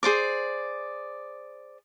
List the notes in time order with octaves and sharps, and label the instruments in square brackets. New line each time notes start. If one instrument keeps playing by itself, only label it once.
[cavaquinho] G#4 C5 D5 D6